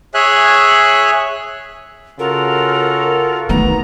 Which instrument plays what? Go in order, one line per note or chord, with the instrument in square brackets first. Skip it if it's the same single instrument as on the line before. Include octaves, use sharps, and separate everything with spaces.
[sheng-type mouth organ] G#4 C#5 E5 G#5 F#6
[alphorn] C#3 [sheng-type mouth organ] F4 F#4 A4 [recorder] A#4
[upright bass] D#3 A3 [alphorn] B3 [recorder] A#5